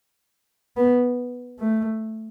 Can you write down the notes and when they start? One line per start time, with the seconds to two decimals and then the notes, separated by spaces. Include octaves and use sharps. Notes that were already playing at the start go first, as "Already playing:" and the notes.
0.77 B3
1.59 A3